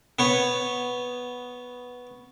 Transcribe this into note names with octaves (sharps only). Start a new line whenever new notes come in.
B3 C#5